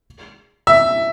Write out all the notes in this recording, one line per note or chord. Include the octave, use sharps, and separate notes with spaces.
E5